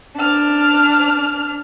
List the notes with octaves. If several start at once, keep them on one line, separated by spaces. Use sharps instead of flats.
D4 F6